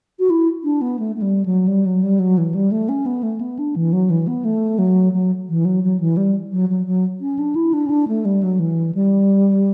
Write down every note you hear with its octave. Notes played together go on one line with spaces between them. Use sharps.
F#4
E4
D4
B3
A3
A3
G3
F#3
G3
F#3
G3
F#3
E3
G3
A3
C#4
B3
A3
B3
D4
E3
F#3
E3
B3
A3
F#3
F#3
E3
F#3
F#3
E3
G3
F#3
F#3
F#3
C#4
D4
E4
D4
C#4
D4
A3
G3
F#3
E3
G3